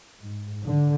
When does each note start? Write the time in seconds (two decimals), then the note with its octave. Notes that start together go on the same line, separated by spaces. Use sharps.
0.20 G#2
0.65 D3